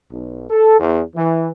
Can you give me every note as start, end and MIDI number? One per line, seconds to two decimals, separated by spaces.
0.11 0.46 35
0.49 0.79 69
0.80 1.02 40
1.16 1.50 52